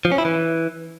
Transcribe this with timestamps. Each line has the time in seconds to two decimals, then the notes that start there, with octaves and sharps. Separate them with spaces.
0.05 F3
0.12 C#4
0.18 E4
0.25 E3